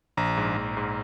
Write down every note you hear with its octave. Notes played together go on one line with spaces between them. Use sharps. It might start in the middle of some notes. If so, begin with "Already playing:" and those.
A#1 A#5
G#2
A#1
G#2